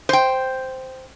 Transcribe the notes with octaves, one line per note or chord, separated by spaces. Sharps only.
C5 G5